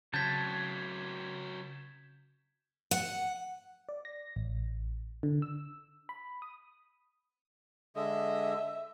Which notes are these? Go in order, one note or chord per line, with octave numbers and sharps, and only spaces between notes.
C#3 F#3 C4 A5 G6 G#6 B6
F#5
D5
A#6
A1
D3
E6
B5
D#6
D3 G#3 D#5 E5